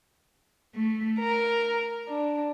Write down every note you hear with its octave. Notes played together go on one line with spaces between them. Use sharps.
A3
A#4
D4